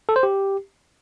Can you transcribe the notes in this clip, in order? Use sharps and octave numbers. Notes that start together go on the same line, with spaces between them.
A4
C5
G4